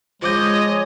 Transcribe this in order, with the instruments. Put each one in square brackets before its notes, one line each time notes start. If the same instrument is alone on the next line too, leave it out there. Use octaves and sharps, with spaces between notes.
[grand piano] F3 D6 G6 [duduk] G#3 [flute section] C#5 [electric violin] D#5